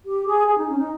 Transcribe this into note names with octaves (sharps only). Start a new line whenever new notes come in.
G4
G#4
G#4
D#4
C#4
D#4